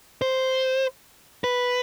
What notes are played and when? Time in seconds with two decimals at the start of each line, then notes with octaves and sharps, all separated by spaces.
0.22 C5
1.44 B4